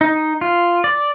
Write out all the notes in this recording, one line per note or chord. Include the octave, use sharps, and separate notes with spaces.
D#4
F4
D5